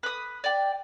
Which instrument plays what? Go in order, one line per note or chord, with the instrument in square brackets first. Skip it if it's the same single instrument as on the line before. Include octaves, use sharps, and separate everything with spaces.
[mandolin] B4 D#6
D5 G5